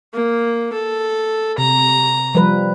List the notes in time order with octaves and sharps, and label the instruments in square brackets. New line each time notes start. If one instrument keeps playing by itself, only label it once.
[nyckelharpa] A#3
A4
[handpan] C3 [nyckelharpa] A#5
[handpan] F3 G3 B4